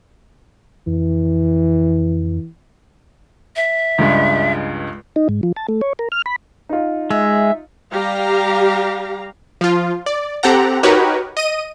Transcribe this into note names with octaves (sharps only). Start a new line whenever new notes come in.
F2 E3
E5
C#2 G2 G#3
D#4
G#2
F3
A5
A3
C#5
A#4
F6
B5
D#4 F4
G#3 E5
G3 G4 F5 A#5
F3 F4
D5
C4 G4 A4 F#5 A#5
D#4 F#4 G4 A#4 B4 C#5
D#5 D#7